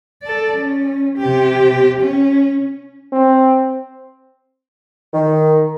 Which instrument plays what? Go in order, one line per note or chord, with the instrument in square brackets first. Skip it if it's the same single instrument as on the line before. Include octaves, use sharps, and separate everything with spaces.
[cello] A4 D5
C#4
C3 G4
C#4
[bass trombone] C4
[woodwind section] D#3